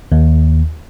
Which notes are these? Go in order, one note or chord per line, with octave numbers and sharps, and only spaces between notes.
D#2